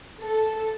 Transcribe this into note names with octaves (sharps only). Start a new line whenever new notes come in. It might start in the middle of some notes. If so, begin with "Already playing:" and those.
A4